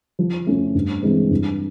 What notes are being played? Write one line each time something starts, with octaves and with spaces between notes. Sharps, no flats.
F3
A3 C#4
G2
E3 G#3 C4
G2